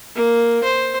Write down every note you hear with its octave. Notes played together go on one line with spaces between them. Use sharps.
A#3
C5